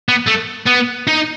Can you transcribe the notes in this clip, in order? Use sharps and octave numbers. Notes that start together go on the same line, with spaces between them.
B3
A3
B3
D#4